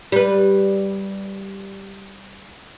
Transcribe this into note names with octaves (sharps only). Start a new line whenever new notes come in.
G3 B4